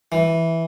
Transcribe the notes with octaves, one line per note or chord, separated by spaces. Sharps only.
E3